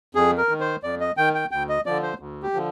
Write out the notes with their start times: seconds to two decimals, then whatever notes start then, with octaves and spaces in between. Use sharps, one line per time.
0.15 F2 G#4
0.38 A#4
0.49 D#3
0.60 C5
0.83 F2 D5
1.00 D#5
1.17 D#3 G5
1.34 G5
1.51 D2 G5
1.69 D#5
1.86 D3 F3 D5
2.03 C5
2.20 D2
2.42 G4
2.54 D3 F3